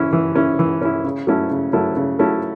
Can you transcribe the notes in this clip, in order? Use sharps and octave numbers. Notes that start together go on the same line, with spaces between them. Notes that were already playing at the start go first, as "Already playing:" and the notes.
Already playing: E3 C#4 E4
E3
C#4 E4
E3
C#4 E4
C#3
F#3 A3 C#4 E4
C#3
F#3 A3 C#4 E4
C#3
F#3 A3 C#4 E4